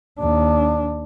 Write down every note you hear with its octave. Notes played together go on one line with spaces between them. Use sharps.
D#2 D4